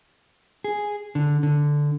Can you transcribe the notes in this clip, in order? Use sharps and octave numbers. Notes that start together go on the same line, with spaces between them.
G#4
D3
D3